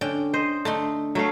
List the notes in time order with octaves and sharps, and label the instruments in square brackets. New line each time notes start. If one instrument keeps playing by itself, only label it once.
[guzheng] D3 C#4 G5
[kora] C5 [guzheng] D#5
[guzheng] D3 D#4 C6 [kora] A3
[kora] F#3 A3 F5 [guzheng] E5